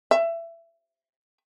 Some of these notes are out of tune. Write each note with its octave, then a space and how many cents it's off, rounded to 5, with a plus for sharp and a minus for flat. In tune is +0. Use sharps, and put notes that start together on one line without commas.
E5 +25